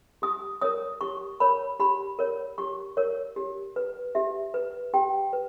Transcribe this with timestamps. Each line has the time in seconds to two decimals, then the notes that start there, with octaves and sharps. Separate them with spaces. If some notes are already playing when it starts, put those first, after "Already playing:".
0.22 G4 D#6
0.61 A#4 C#5 D#6
1.01 G4 C#6
1.40 A#4 C#5 B5
1.80 G4 B5
2.19 A#4 C#5
2.58 G4 C#6
2.97 A#4 C#5
3.36 G4
3.76 B4
4.15 G4 E5
4.54 B4
4.94 G4 G5
5.33 B4